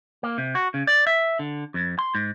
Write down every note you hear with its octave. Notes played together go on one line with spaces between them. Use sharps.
A#3
C3
F#4
C#3
D5
E5
D3
F2
C6
G#2